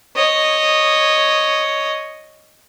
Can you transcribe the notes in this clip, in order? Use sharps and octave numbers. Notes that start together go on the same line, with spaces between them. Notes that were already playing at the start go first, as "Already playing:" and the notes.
C#5 D#5